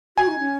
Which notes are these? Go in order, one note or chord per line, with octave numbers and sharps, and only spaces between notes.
F#4 G#5
D#4
C#4